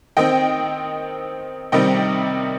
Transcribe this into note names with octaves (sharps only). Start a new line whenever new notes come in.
D#3 C4 D#5 G5
C3 D#3 G3 C4 D#5 G5